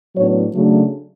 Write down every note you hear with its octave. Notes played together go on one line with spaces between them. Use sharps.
A2 F#3 B3 D4 C#5
C#3 F#3 A3 D4